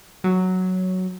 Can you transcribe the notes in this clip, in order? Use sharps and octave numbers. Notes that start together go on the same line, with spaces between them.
F#3